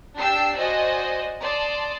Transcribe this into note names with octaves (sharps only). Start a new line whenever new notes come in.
D4 G4 G5 E6 C7
F#4 C5 D5 D#5 G#5
D5 A5 C6 D#6